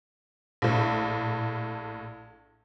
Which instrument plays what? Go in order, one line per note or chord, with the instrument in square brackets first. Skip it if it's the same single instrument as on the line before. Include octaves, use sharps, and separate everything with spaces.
[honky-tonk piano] A#1 A2